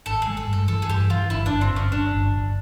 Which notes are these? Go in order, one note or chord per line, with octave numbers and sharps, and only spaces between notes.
G#1 A4
G#4
G#3
A4
G2
A4
E3 A4
G#4
G2 G4
E3 F4
G1 E4
G1 D4
C4
G1 C#4
G1 D4
G1
G1